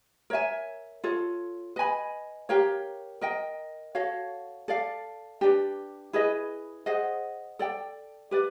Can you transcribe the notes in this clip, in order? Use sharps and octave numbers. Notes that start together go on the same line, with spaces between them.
A#4 C#5 E5 G#5
F4 A4 C#5
B4 D#5 G#5 B5
G4 A#4 C#5 F5
A#4 D#5 G5
F#4 A4 C#5 F5
A4 D5 F5
D4 G4 B4 D5
E4 G#4 B4 D#5
G#4 C5 D#5 F#5
A4 D5 G5
G4 B4 D5